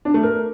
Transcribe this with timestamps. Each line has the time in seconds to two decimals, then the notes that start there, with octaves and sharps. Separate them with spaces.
0.05 D4
0.14 A3
0.23 A#4